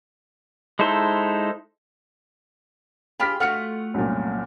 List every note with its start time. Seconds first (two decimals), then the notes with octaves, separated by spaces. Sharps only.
0.79 G#3 D#4 E4 A4 C5
3.20 F4 G4 G#4 B5 F6 B6
3.40 A3 F4 F#4 F#5 F6 C#7
3.94 C2 F#2 A#2